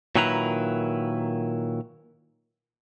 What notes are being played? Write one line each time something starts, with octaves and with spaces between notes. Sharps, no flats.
A#2 D#3 F#3 E4 B4 A#5